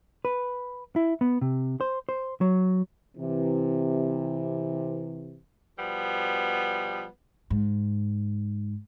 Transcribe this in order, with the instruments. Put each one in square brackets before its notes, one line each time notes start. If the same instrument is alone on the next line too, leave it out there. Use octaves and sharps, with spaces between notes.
[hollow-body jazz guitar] B4
E4
B3
C3
C5
C5
F#3
[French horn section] C3 E3
[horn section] B2 F3 G3 B3
[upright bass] G#2